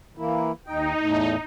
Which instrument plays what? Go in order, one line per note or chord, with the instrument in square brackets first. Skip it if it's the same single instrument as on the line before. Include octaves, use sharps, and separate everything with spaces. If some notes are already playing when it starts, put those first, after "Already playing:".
[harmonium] E3 A#3 E4
[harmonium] D#2 G5 [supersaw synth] D#4
[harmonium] E2 A2 A3